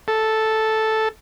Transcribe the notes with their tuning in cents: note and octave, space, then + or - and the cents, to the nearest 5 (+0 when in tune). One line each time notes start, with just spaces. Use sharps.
A4 -5